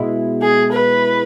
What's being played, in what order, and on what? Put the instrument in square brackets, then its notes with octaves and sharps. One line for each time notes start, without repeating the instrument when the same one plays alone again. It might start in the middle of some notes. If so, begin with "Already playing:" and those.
Already playing: [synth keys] B2 G#3 E4
[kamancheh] G#4
B4